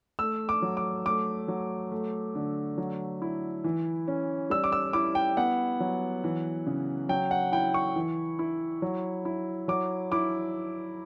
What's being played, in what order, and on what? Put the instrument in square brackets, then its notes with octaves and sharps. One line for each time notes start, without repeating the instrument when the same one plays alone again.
[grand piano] A3 E6
D6
F#3
D6
A3 D6
F#3
A3
D3
F#3
E4
E3
C#4
G3 E6
D6
E6
E4 D6
G5
B3 F#5
F#3
E3
C#3
F#3 G5
F#5
E4 G5
C#6
E3
E4
F#3
E4
F#3 D6
E4 D6